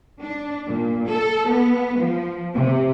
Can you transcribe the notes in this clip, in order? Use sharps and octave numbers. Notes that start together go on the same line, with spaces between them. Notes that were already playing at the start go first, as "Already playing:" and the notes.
D4
A#2
A4
B3
F3
C3